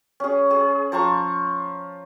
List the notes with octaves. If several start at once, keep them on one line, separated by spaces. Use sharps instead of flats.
C#4 G#4
G#4
F3 A5 A#5 C#6